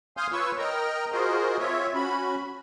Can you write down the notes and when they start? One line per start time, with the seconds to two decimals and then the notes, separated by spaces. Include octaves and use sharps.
0.17 F5 G#5 C6 D#6 F6 G6
0.32 F4 B4 C#5 C#6 E6
0.58 A#4 D#5 G5 A#5
1.12 F4 F#4 G#4 A#4 C5 D#5
1.59 C4 F4 C#5 E5
1.94 C#4 F#4 B5